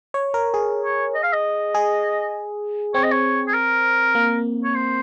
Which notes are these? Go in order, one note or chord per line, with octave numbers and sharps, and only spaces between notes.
C#5
A#4
G#4
C#5
D#5
F5
D#5
G#4
C4 C#5
D#5
C#5
G#4
A#4
A#3
C#5
C5